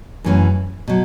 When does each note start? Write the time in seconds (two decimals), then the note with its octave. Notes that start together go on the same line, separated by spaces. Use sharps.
0.24 F#2 E3 A3 C#4
0.88 B2 F#3